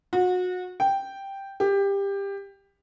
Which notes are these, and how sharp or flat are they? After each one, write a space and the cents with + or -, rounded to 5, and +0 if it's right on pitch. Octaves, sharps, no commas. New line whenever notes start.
F#4 -30
G5 +0
G4 +20